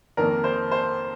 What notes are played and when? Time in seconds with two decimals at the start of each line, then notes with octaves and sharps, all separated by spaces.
0.17 F2 D#3 A#3 A#4
0.44 C5
0.71 C5